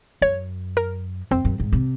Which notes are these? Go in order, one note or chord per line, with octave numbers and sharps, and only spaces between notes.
F#2 C#5
A#4
F2 C4
F#2
G#2
C3